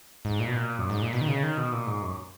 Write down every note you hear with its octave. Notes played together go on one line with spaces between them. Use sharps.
G#2
A#2
B2
A#2
F#2
G#2
A#2
B2
D#3
C#3
D#3
B2
A#2
G#2
F#2